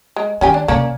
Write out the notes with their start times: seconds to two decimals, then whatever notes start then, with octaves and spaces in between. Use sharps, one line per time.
0.16 G#3
0.41 D#3 C#4 G4 G#5
0.54 D4
0.68 C3 A#3 C#4 D5